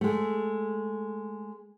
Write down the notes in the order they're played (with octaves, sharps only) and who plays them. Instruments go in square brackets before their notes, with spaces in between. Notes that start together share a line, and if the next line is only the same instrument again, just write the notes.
[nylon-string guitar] G#3 A3